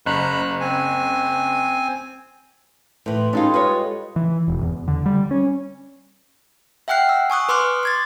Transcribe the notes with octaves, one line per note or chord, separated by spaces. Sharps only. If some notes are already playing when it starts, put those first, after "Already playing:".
F#1 A#5 B5 F#6
C4 G#5
A2 E3 C5
G3 G#3 C#4 D#4 F4 A4
F4 B4 C#5 D#5
E3
E1
E2
D3
G3
C#4
E5 F#5 G5 F6 F#6 C7
E6
G#5 C#6 D#6 F#6
B4 C6 D6 F6 F#6
C6 G#6 A6